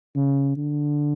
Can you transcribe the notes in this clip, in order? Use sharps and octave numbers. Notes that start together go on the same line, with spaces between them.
C#3
D3